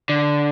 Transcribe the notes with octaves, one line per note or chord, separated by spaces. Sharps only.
D3